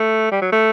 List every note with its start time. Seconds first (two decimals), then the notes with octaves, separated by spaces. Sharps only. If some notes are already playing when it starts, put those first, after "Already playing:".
Already playing: A3
0.31 G3
0.41 F#3
0.52 A3